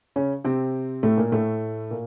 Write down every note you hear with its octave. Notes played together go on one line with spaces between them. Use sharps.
C#3 C#4
C3 C4
A2 A3
A#2 A#3
A2 A3
A#2 A#3